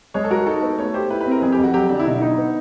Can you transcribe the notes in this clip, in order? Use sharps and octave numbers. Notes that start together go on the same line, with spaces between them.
G#3 C#5
A4
F#4 A#4
D#4 A4
B3
A3 C#5
G4 C5
E4 B4
B4
C4
A#4
F2 G#4
G4
F2
F#4
F#3 G4
D3 D4
E4
B2 D#4
D#4
B3